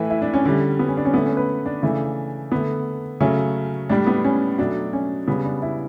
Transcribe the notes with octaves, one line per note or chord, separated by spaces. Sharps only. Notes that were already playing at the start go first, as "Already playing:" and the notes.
Already playing: A2 E3 A3 B4
E4
D4
C#4
D3 G3
B3
C#4
D4
C#4
D3 A3 B3
C#4
B4
D4
C#3 E3 A3
D3 A3 B3
C#3 F#3 A3 C#4
A2 G3 D4
B3
C#4
B2 F#3 A3 D4
C#4
C#3 G3 B3
D4
E4